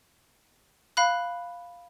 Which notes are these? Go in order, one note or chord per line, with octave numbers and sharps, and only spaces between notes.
F5 B5 F#6